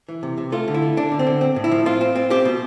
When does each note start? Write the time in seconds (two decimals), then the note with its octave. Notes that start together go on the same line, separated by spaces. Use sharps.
0.09 E3
0.23 C3
0.37 C3
0.52 A3 F4
0.68 D3
0.74 E4
0.82 A3
0.97 D3 D4
1.12 D3
1.19 C4
1.26 D3
1.41 C4
1.56 A2
1.64 E4
1.71 F3
1.85 C4 F4
2.01 C4
2.16 C4
2.30 C4 G4
2.45 B2